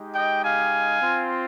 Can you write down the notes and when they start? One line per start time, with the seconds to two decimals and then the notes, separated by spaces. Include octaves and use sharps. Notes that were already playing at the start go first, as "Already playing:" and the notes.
Already playing: G#3 D#4 G4
0.15 D#5 G5
0.44 F5 G#5
1.01 C4 F4